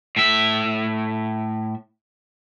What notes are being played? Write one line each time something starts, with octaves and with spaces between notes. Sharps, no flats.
A2 E5